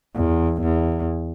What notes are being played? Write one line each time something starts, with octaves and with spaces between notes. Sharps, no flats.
E2
E2